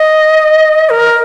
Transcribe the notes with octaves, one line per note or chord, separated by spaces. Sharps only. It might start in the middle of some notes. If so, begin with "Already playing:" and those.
Already playing: D#5
A#4